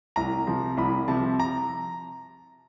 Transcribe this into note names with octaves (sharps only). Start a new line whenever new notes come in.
C2 A#5
C3 F3
C2 B5
C3 F3 A5
A#5